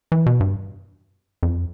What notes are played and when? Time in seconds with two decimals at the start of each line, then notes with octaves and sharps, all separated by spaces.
0.12 E3
0.26 B2
0.40 G2
1.43 F2